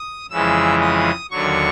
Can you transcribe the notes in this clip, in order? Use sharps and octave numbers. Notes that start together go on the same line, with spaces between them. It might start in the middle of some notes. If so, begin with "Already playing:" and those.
Already playing: D#6
F2 C#3 E3 G#3 E6
D#6
D#2 D3 F#3 C#6